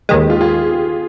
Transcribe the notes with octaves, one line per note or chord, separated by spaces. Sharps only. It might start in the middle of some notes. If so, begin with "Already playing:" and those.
D#2 D#3 G#3 G4 B4
F4 G#4
F4 G#4